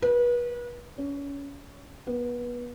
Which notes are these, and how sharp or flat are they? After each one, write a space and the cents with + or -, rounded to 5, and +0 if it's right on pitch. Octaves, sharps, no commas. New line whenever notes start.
B4 -35
C#4 +25
B3 -25